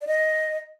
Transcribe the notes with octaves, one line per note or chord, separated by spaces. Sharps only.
D5
D#5